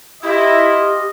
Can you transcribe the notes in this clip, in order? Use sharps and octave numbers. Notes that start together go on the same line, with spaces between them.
E4 F4 G4 D#5